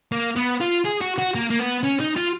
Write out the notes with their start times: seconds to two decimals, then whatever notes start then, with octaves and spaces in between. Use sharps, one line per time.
0.12 A#3
0.36 B3
0.61 F4
0.85 G#4
1.01 F#4
1.18 F#4
1.35 A#3
1.50 A#3
1.59 B3
1.83 C#4
2.00 D#4
2.16 F4